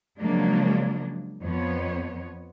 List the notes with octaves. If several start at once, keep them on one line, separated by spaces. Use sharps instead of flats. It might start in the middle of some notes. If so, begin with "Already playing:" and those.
C#3 F3 F#3 G#3 A#3 D4
F2 F3 B3 C#5